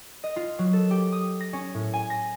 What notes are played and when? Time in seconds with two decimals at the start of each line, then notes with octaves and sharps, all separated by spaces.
0.24 D#5
0.36 F4
0.59 F#3
0.73 A4
0.91 G4
1.12 D#6
1.41 A#6
1.53 C#4
1.74 A2
1.94 G#5
2.10 A#6